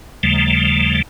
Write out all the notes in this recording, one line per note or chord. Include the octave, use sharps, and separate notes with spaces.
D#2 C#3 F3 G3 A3